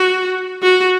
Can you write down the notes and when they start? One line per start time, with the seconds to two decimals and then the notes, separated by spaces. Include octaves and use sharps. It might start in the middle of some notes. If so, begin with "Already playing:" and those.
Already playing: F#4
0.63 F#4